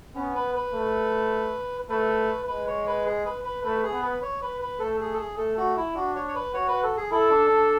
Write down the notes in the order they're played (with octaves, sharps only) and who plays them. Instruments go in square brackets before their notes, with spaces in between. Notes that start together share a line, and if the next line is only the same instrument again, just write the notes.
[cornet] B3 [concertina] C#4
[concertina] B4
B4
[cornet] A3
[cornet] A3 [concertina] B4
[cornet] G#3 [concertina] B4
[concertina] C#5
B4
G#4
B4
B4
[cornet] A3 [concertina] B4
[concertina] G#4
[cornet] B3
[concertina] B4
C#5
B4
B4
[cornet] A3 [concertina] A4
[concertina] G#4
A4
G#4
[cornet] A3 [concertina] A4
[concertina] F#4
E4
[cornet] D4 [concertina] F#4
[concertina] C#5
C#5
B4
[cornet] F#4 [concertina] C#5
[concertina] B4
A4
G#4
[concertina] E4 [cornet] A4
[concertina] D4
D4